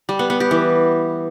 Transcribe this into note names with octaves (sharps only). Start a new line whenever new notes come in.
G3
B3
B3
G4
E3